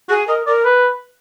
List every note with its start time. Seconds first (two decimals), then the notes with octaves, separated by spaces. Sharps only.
0.09 F#4 G#4
0.27 A#4 D#5
0.47 A#4 D5
0.65 B4